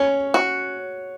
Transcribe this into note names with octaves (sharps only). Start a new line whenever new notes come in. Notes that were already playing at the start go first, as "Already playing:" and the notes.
Already playing: C#4 C#5
F#4